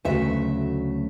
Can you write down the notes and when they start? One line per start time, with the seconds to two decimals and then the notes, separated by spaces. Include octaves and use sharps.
0.05 D2 C#3 F#3 A3 E5